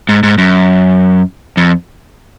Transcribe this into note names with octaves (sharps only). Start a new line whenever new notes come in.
G#2
G#2
F#2
F2